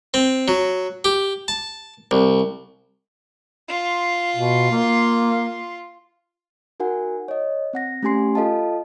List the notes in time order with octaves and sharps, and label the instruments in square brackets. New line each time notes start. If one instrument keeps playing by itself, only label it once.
[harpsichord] C4
F#3
G4
A5
C2
[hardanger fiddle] F4 C6
[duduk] B2
A#3
[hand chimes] D#4 F#4 A#4 F#5 G#5
C#5 D#5
C4 F#5 A#6
A3 C#4 G4 G#5 C6 C7
F4 A4 D#5 F5 A5